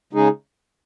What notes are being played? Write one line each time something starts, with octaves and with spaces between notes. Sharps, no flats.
C#3 G#3 D#4 G#4